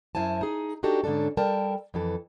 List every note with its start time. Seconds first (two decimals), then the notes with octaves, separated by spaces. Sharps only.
0.15 F#2 E4 C5 G#5 A5
0.41 D#4 G#4
0.83 D4 D#4 F#4 G4 A4
1.04 G#2 D3 C#4 D4 A4
1.37 G3 A4 A#4 G5 A5
1.94 F2 E3 A4